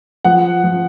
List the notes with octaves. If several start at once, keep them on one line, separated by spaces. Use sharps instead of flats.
F3 F#5
F3